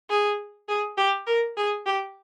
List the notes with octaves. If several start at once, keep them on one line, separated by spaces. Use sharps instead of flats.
G#4
G#4
G4
A#4
G#4
G4